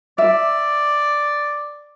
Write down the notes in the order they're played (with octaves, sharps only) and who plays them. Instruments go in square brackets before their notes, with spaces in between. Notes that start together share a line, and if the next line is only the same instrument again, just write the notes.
[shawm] D5 [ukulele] E5